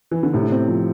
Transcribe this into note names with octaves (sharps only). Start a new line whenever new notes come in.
E3
D3
A2 C3
C4
F3